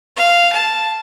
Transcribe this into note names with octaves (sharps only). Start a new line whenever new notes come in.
F5
A5